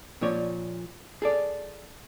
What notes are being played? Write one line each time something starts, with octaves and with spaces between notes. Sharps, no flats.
A#2 F3 C#5 D5
G#4 A4 D5